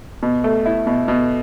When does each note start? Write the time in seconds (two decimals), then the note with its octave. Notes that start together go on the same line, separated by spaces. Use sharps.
0.23 B2
0.44 A3
0.66 E4
0.87 B2
1.08 B2